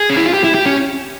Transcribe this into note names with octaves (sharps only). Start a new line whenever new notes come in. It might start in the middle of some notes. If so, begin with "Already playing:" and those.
Already playing: G#4
C#4
E4
F4
G4
E4
G4
C#4